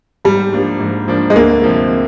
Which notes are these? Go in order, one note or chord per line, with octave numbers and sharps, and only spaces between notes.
G#2 G3
F3 A#3 D4
G#2
F3 A#3 D4
G#3
D2 A#3
C3 F3